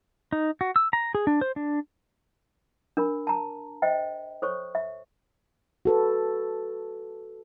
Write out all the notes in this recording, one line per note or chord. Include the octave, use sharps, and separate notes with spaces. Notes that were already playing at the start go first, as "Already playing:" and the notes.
D#4
F#4
E6
A#5
G#4
D4
C5
D4
D4 A#4 B5
A5 A#5
C5 D#5 E5 G5
A4 C5 C#5 C#6
E5
F#4 A4 B4